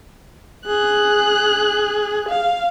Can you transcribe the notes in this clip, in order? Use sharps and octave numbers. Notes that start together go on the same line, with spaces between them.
G#4 F#6
F5